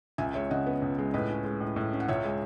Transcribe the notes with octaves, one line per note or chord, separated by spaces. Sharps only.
C#2 E5 G#5
G#3 C#5 E5
C#3 D#5 F#5
B3
C#2
G#3
A2 B4 D#5
C#4
G#3
A2
A2
C#4
F#5
C#2 C#5 E5
G#3